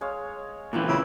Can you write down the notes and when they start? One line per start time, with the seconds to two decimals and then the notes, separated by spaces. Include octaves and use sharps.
0.01 G#3 C#5 F5
0.73 A#2 E3 C4 E4 B4
0.89 C#3 E4 F4 D5 C6